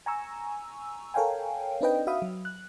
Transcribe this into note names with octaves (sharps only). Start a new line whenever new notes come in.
G#5 A#5 C#6 E6
A4 A#4 C#5 F5 G5 G#5
C4 D4 D#4 B4 D#5 G5
F#4 E5 F5 B5 D#6
F#3
F#6